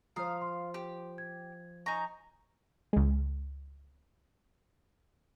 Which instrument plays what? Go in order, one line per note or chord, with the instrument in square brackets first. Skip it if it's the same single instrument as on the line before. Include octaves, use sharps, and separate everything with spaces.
[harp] F3 C5 [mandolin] F5 [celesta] A#5 D#6
[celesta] C6
[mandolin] G4
[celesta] G#6
[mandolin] D#4 G#5 A#5 [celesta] C#6
[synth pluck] C#2 G#3